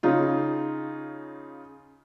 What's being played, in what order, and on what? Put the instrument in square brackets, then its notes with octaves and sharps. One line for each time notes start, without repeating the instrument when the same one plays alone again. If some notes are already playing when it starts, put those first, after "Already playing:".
[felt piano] C#3 C#4 D#4 F4